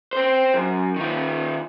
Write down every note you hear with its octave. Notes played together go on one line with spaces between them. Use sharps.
C4 C5
F#2
D#3 F4